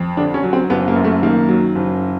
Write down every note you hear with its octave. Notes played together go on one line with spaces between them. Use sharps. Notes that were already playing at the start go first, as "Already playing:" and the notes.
Already playing: F2
D3 D4
C#4
F#3
C4
F#1 B3
A#3
F#2
A3
D#3 A#3
F#3
F#1